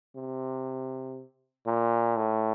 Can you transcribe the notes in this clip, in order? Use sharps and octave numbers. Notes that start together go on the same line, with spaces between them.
C3
A#2
A2